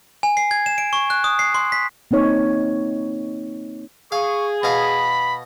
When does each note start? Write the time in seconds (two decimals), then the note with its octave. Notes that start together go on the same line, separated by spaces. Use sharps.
0.23 G#5
0.37 C7
0.51 G#6
0.66 E7
0.78 D7
0.93 C#6
1.10 F#6
1.24 D#6
1.39 C7
1.54 C6
1.72 B6
2.11 A#3 C4 D#4 C#5
4.12 G#4 F5 C#6
4.63 B2 F5 B5